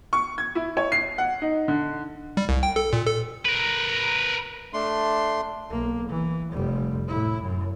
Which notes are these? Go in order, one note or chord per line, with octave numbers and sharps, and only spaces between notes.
C#6
G#6
E4
C#5
C7
F#5
D#4
D3
G3
C2
G5
A4
A#2
A4
A#4 B4
A3 D4 C6
B1 A#3
E3
F1 G3
A2 E4
F#2